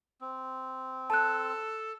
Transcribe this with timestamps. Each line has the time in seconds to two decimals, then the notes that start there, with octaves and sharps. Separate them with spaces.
0.21 C4
1.10 A4 A5 F#6